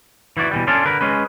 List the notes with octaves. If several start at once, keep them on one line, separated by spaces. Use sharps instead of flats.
E3 E4 F#4 D5
B2 E3 G3
C#4 D4 F4 A4 D5
D3 A#4 B4
G#3 C#4 B4